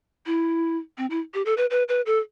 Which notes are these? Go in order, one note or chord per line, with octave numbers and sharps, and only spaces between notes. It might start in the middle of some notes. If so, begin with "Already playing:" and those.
E4
C4
E4
G4
A4
B4
B4
B4
A4